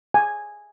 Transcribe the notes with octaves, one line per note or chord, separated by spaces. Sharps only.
G#5